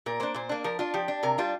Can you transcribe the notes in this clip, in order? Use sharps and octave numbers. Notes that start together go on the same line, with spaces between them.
A#2 A#4
A#3 D4 C5
A#2 C5
A#3 D4
F3 A#4
D4 F4
F3 G4
D4
C3 A#4
G3 D4 F4